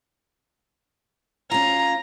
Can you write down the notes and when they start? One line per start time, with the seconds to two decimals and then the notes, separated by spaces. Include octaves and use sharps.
1.51 C#4 F4 A#5